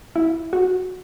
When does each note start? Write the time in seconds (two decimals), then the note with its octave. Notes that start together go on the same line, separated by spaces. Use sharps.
0.16 E4
0.53 F#4